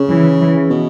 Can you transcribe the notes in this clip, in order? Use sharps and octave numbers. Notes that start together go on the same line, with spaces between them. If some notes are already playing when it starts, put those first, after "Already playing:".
Already playing: C#3
E3
E3
B2